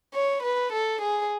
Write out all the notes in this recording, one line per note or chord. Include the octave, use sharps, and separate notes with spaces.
C#5
B4
A4
G#4